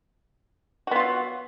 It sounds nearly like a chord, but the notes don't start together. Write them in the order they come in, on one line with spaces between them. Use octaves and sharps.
F#4 B3 F4 F#3